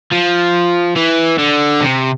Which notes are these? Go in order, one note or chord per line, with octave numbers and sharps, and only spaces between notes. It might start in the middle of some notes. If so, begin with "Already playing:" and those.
F3
E3
D3
C3